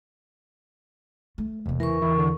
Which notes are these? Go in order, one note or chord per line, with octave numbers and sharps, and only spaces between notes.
A3
E1 C3 A#3
E2 C#3 E3 A#4 C#6
E3 E4
D3